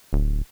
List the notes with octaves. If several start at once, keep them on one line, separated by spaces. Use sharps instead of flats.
D1